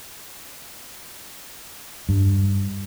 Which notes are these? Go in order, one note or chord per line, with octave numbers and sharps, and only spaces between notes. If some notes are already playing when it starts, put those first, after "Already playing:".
G2